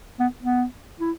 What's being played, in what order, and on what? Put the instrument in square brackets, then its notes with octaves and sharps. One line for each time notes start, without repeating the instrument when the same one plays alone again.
[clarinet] B3
B3
E4